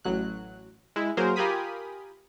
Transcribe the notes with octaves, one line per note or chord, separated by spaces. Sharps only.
A1 F#3 F#6
G#3 E4
F#3 A#3 G#4 A#4 C5
F4 G4 A#4 G#5 B5 D#6